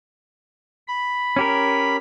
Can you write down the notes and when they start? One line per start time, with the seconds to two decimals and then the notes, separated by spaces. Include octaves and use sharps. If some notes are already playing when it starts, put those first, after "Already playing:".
0.88 B5
1.36 C#4 G4 A#4